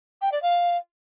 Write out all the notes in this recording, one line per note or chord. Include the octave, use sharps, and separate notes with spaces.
G5
D5
F5